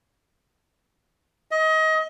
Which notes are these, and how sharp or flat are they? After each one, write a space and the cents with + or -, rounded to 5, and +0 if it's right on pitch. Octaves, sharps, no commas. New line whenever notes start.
D#5 +25